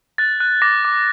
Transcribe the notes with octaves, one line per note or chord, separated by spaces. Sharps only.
F#6 A6
F#6
D6 A#6
D6